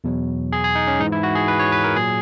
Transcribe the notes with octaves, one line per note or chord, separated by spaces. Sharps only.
E2 B2 F#3
G#4
G#4
D#4
C#4
G#2 E3 D#4
E4
F#4
G#4
B4
C#5
B4
A#4
A#2 F#3 G#4